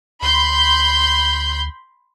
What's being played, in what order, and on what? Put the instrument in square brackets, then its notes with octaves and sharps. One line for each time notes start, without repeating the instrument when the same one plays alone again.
[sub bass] D2 [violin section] B5 C6 G6